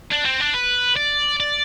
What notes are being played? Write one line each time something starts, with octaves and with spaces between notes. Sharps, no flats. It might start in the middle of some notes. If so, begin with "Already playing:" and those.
D4
C4
D4
B4
D5
D5